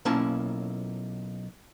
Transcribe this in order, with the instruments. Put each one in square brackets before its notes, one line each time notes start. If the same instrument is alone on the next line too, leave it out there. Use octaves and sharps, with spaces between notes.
[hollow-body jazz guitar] B1 A#3 C#4 E4 F4 A5